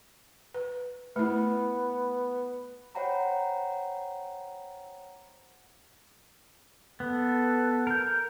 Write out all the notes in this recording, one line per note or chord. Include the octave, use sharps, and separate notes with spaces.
B4
A3 B3 E4
C5 C#5 F#5 G5 A#5 B5
B3 A4
A#4 G6